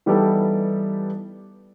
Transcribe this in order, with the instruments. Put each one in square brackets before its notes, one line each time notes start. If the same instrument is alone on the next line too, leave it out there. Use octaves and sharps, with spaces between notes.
[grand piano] E3 G3 B3 D#4 G4 A4